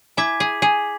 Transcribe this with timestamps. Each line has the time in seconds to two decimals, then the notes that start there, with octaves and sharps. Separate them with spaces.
0.17 E4 G#5 D6 G#6 B6
0.40 G#4
0.62 G#4